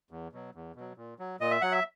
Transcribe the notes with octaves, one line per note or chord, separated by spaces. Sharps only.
E2
B2 F#3
E2
B2 F#3
A#2
F#3
A#2 D#5
E5
F#3 F#5
E5